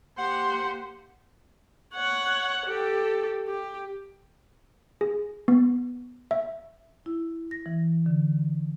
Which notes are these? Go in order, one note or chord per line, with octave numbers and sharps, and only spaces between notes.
A#3 G4 C5 F#5
C#5 F#5
G4 A4
G4
G#4
B3
E5
E4
A#6
E3
D3